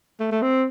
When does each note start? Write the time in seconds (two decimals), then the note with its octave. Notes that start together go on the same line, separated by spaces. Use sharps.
0.20 A3
0.32 A3
0.42 C4